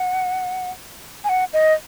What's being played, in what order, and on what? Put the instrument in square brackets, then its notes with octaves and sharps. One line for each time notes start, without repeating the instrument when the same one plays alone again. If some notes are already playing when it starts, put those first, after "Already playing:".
Already playing: [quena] F#5
G#5
F#5
D#5